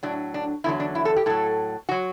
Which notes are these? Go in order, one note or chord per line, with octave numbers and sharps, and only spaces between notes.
A2 F#3 D4
D4
E2 D3 F#3 E4
D4
E4
A4
G4
A2 F#3 A4
F#3 F#4